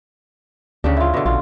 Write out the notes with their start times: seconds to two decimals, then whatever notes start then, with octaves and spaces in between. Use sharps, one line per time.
0.84 D2 C#3 G3 D4
0.97 E4 F4
1.14 B2 D3
1.26 A#1 F4